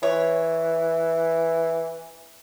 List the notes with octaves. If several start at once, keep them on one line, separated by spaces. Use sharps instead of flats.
E3 C#5